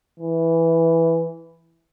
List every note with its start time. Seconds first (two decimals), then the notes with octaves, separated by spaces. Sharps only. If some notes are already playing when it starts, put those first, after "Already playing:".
0.20 E3